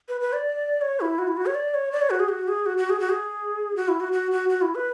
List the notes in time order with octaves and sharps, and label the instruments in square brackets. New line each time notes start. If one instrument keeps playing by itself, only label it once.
[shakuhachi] B4
B4
D5
C#5
E4
F#4
E4
F#4
C#5
D5
C#5
D5
C#5
F#4
G#4
F#4
G#4
F#4
F#4
G#4
F#4
G#4
F#4
E4
F#4
F#4
F#4
F#4
E4
B4